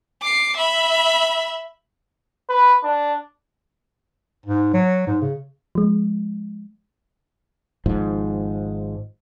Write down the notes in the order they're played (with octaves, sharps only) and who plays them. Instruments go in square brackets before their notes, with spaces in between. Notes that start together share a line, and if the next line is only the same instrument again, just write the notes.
[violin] D6 C7
E5 B5
[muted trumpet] B4
D4
[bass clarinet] G#2
F#3
G#2
C#3
[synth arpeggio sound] F3 G#3
[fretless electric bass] G#1 G#2 F3